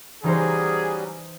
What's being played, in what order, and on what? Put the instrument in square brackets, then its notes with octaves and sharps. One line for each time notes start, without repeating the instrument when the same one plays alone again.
[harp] E3 D#4 C5 [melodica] F#3 G3 C#4 [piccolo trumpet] G#4